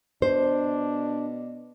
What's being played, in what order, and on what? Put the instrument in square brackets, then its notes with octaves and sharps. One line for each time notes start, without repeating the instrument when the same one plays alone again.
[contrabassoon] B2 [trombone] D4 [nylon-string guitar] C5